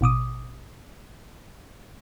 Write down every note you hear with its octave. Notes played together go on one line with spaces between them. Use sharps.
A1 B2 D6 D#6